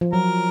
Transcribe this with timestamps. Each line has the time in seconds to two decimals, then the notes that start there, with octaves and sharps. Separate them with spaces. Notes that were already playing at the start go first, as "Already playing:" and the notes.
0.01 F3
0.13 F#3 A#4